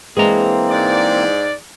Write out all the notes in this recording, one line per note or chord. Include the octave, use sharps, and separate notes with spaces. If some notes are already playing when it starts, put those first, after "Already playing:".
E3 G#3 A#3 C4 D4 G#4 A#5
G#2 D5